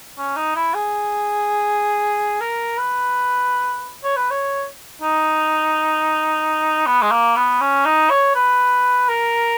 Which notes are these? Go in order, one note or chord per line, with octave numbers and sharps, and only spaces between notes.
C#4
D#4
E4
G#4
A#4
B4
C#5
B4
C#5
D#4
B3
G#3
A#3
B3
C#4
D#4
C#5
B4
A#4